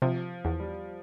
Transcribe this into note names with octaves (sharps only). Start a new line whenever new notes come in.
C3 F3
E2
G3